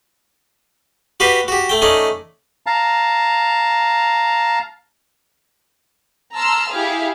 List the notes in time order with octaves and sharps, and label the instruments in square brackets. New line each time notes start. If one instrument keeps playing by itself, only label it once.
[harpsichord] F#4 G4 B4 F5 G5
F#4 G4
A3 G5
A3 C#4 D#4 D5
[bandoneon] F5 A5 A#5
[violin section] A5 A#5 C6 E6 F6
E4 G4 G#4 F5